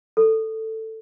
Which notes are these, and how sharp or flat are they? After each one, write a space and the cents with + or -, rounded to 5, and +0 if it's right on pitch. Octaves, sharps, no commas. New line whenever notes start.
A4 +10